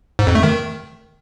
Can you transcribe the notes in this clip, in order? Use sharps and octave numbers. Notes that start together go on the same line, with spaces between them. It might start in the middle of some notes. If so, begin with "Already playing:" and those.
G#2
F2
A3
D#3